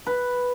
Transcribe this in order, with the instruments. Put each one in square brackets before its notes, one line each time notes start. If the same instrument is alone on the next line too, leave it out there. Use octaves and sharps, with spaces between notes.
[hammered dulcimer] B4